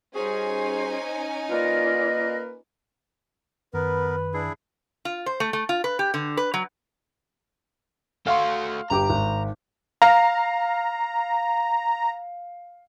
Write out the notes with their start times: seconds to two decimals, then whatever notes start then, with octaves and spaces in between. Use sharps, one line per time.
0.15 G3 C#4 D#4 F#4 G#4 C5 G#5
1.50 A#3 F4 A#4 B4 D5 D#5
3.74 F#2 D#3 B3 A#4 B4
4.34 D4 E4 G#4
5.05 F4
5.26 C5
5.40 A3
5.53 A3
5.69 F4
5.84 B4
5.99 G4
6.14 D3
6.37 B4
6.54 F#3
8.27 A3 F#4 F5 C6
8.90 G1 G4 A#5 D6
9.10 G#1
10.02 F5 A#5